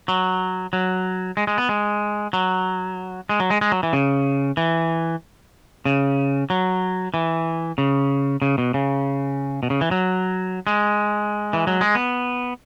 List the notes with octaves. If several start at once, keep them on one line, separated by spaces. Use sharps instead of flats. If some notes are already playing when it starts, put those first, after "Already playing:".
F#3
F#3
G#3
G#3
B3
G#3
F#3
G#3
F#3
G#3
G#3
F#3
E3
C#3
E3
C#3
F#3
E3
C#3
C#3
B2
C#3
B2
C#3
E3
F#3
G#3
E3
F#3
G#3
B3